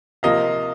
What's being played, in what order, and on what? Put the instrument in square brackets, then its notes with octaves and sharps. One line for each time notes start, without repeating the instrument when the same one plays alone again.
[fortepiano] C3 F3 A#3 [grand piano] D#5 F5